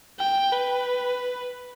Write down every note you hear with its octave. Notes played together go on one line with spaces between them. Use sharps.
G5
B4